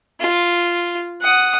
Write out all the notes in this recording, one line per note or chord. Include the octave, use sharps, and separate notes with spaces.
F4
F#5 D#6